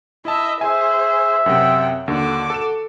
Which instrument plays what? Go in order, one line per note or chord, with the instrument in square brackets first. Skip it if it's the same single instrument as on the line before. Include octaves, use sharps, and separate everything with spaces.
[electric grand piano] E4 A5 [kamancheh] D#5 E5
[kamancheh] G#4 C5 [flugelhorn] E5 [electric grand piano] G#5
[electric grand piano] F#2 C3 [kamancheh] F#5 G5
[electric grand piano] D#2 D3 [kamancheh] F#4 D6
[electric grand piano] A4 E7